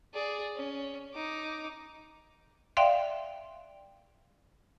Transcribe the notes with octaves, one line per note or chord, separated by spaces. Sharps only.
G#4 D5
C#4
D#4 D6
D5 E5 F5 G5 C6